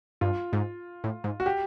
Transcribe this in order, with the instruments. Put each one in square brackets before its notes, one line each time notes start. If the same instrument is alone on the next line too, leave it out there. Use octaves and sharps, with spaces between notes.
[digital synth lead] G2 [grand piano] F4
[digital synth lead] G#2
A2
G#2
[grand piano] F#4
G4